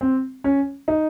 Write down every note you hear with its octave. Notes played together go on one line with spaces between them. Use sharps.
C4
C#4
D#4